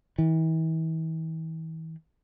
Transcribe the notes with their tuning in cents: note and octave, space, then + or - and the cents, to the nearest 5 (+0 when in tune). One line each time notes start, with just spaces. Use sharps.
E3 -40